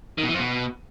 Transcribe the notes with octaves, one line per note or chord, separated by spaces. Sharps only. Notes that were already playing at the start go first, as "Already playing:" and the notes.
D#3
B2
E3
F2
B2